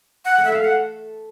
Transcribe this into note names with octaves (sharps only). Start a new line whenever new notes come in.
F#5
A3 A4
E5
A3 A4 F5
F#5